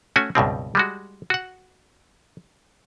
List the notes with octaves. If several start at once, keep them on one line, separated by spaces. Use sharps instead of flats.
A3 C#4 F#4 G#5
C#2 G2 B2 C4
G3 G#3 F#4
F#4 F#5